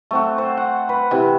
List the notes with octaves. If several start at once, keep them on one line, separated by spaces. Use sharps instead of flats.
A3 C4 F#4
C5
F#5
B4
C3 E3